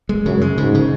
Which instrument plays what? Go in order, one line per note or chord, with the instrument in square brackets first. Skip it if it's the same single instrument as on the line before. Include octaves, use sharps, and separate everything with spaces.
[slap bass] G#3
[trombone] F#2 [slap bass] C#3
[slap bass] G#3
[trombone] G#2 [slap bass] C#3
[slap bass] C#3